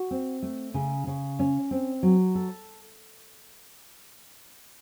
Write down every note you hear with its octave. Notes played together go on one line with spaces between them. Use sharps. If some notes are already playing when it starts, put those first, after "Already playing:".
Already playing: F#4
C4
A3
C#3
C#3
C#4
C4
F#3
A4